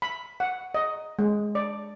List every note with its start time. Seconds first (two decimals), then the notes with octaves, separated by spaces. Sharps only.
0.02 B5
0.40 F#5
0.74 D#5
1.19 G#3
1.55 D5